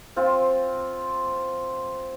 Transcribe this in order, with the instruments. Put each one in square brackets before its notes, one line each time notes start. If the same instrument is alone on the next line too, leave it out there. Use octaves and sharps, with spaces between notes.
[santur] C4 F4